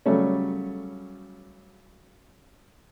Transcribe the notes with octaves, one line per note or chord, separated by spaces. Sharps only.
C#3 F#3 G3 A3 C#4